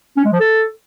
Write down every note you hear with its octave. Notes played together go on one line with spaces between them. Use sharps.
C#4
G#3
F3
A4